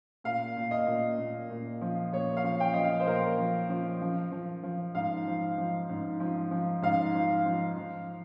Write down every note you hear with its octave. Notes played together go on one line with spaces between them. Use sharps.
A#2 F5
A#2
D#5
A#2
A#2
A#2
F3
A#2 C#5
F5
F3
G5
F3 D#5
F5
C5
A#2 A#4
F3
F3
F3
F3
F3
G#2 F5
F3
F3
G#2
F3
F3
G#2 F5
F3
F3
F3